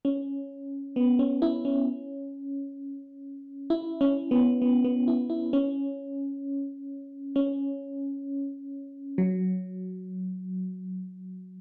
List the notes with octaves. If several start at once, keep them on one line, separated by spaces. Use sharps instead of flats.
C#4
B3
C#4
E4
C#4
E4
C#4
B3
B3
B3
E4
E4
C#4
C#4
F#3